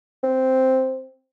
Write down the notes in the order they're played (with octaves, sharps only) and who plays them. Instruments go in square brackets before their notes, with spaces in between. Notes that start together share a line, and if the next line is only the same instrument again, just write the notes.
[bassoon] C4